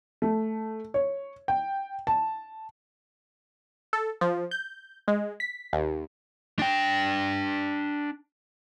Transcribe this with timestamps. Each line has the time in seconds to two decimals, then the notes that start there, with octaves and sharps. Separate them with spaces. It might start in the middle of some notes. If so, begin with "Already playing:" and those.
0.22 A3
0.94 C#5
1.48 G5
2.07 A5
3.93 A4
4.21 F3
4.51 G6
5.08 G#3
5.40 B6
5.73 D#2
6.59 D4 G5